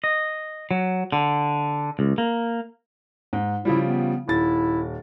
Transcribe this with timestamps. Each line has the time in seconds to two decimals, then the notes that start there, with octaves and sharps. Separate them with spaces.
0.04 D#5
0.71 F#3
1.12 D3
1.99 C#2
2.18 A#3
3.33 G#2
3.65 C#3 F3 G3 E4
3.87 B3
4.28 D#1 E4 A6